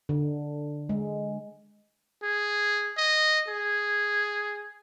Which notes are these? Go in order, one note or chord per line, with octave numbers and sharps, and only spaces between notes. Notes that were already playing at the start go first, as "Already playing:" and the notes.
D3
G#3
G#4
D#5
G#4